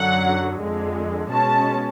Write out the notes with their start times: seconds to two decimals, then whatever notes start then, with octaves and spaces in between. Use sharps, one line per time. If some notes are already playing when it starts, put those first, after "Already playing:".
Already playing: F#2 D3 F#3 F#5
0.60 F2 D3 G#3
1.31 B2 G#3 C#4 A5